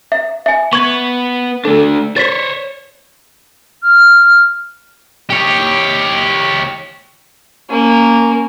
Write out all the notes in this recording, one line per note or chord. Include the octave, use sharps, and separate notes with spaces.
E5
E5 G#5
B3 C#6 G#6
A3 D4 A4
C5 C#5 A6 B6
F6
G4 C#5
A#3 C#4